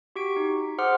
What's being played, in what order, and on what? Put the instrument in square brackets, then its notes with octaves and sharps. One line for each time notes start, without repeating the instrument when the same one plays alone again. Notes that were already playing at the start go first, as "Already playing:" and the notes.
[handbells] F#4 G4 C#6 B6 D7
D#4
G#4 C5 F#5 C6 D6 F6